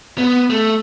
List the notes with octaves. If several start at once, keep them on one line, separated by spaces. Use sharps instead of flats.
B3
A3